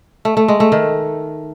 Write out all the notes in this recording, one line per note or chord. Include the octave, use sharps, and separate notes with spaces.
A3
A3
G#3
A3
D#3